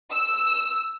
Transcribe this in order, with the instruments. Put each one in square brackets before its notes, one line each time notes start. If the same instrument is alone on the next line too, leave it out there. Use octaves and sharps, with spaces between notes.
[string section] E6